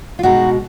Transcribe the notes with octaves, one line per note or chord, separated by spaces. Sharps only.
F4
B2 G#3 D#4 F#4